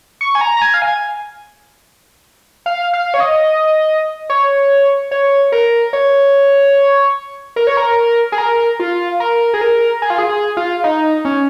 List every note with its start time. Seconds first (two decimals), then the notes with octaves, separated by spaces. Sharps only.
0.21 C#6
0.35 G#5
0.41 A#5
0.57 A#5
0.62 G#5
0.74 F5
0.82 G#5
2.66 F5
2.93 F5
3.14 C#5
3.20 D#5
4.30 C#5
5.11 C#5
5.52 A#4
5.93 C#5
7.56 A#4
7.67 C#5
7.77 A#4
8.32 G#4
8.38 A#4
8.80 F4
9.20 A#4
9.54 G#4
9.61 A#4
10.02 G#4
10.10 F4
10.18 G#4
10.29 G#4
10.57 F4
10.84 D#4
11.25 C#4